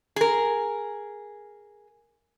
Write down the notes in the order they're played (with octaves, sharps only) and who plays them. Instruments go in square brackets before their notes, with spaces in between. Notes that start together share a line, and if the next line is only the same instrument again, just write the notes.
[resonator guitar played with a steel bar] G#4 A#4